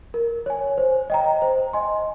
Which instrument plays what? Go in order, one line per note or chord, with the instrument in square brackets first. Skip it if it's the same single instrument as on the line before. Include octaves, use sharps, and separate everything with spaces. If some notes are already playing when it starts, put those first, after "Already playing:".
[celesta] A#4
C#5 G#5
C5
D#5 G5 A#5
C5
D#5 G#5 C6